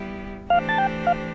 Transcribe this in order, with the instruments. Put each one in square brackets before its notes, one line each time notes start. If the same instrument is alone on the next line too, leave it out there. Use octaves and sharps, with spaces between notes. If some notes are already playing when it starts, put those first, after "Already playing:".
Already playing: [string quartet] G3 B3 E4 G4
[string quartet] E3 A3 D4 G4 C5 [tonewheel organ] F5
[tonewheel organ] A5
G5
F5